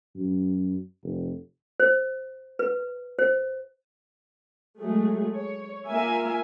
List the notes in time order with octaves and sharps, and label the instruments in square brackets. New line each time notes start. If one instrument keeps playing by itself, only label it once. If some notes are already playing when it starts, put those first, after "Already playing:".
[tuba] F#2
F1
[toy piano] C5
B4
C5
[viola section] F#3 G#3 A3 G#4
C#5
A#3 F4 A#4 E5 G#5